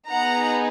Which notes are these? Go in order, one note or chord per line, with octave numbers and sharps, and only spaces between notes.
B3 D#4 G#4 F#5 A#5